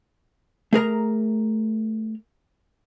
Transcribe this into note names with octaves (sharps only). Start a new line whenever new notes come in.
A3 G#4 A#4 A#5